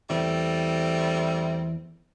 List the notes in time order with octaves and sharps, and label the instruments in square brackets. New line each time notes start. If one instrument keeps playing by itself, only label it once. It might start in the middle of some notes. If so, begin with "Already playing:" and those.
[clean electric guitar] E2 E3 [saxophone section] G3 A3 C4